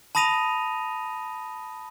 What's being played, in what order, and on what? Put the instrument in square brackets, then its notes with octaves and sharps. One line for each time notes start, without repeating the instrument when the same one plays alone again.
[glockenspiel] A5 B5 D#6 A#6 D#7 F7